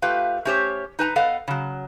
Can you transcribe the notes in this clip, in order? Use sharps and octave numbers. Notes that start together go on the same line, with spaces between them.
A3 F4 G4 B4 F5
A3 C#4 G4 C5 C#5
D#4 B4 A5 A#5
B3 A4 B4 D#5 F5 F#5
C#3 F#3